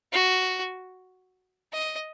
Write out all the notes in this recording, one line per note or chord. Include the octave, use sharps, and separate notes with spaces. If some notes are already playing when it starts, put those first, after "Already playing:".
F#4
D#5